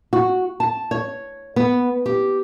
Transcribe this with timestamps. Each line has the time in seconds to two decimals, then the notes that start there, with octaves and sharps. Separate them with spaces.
0.13 F#4
0.60 A5
0.91 C#5
1.56 B3
2.06 G4